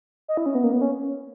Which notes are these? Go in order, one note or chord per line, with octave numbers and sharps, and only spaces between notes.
D#5
E4
C#4
B3
A#3
B3
C#4